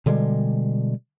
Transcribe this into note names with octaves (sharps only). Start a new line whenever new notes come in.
B2 D3 G3 G#3